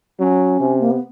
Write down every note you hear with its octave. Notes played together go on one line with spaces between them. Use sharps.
F#3 C#4
C3
A#3
B3